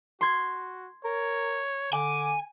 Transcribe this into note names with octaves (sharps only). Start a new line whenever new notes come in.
F#4 C6 G#6
A#4 C#5
D3 G#5 D6